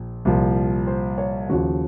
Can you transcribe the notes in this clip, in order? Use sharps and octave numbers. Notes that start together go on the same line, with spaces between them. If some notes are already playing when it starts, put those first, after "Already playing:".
Already playing: A#1
C2 A#2 F3
C5
C#5
D#2 C#3 F3 F#4